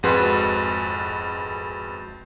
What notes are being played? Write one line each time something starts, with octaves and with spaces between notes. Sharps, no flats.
G#1 F2 G#3 F#4 B4 C6